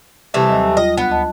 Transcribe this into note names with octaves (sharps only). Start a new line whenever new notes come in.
C3 E3 G3 A3 A5
D#2 F#3 D#5
F4 D#5 G5
D2 B3 F#6
D#5 A5